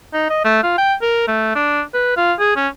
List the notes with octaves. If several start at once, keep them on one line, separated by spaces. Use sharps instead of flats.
D#4
D#5
A3
F4
G5
A#4
A3
D4
B4
F4
G#4
C#4